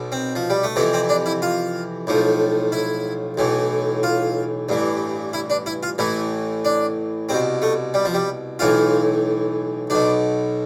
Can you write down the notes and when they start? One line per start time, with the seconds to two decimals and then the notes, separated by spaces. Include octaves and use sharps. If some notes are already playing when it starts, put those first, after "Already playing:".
Already playing: B1 B2
0.12 C4
0.36 F3
0.50 G3
0.64 A3
0.76 F2 C3 E3 B3
0.94 C4
1.09 D4
1.26 E4
1.42 F4
2.07 B1 A2 F3
2.72 E4
3.38 B1 A2 E3
4.03 F4
4.69 A1 G2 E3
5.33 E4
5.50 D4
5.66 E4
5.83 F4
5.98 A1 A2 E3 E4
6.65 D4
7.29 C2 B2 C4
7.62 A3
7.94 G3
8.05 F3
8.14 G3
8.59 B1 A2 E3 F4
9.90 B1 B2 D4